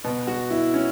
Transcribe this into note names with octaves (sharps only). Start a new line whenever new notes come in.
B2
F#4
E4
C#4